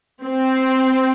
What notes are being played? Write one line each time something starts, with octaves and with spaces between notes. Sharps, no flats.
C4